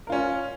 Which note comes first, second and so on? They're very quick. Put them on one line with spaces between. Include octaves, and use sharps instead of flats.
A#4 F4 C#4